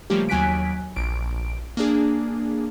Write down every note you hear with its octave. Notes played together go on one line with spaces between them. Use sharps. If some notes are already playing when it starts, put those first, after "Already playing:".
C#3 F3 G3 A3 A#3 G4
D#2 F#3 G#5 F#6 B6 D7
A#1 D7
A#3 D4 G#4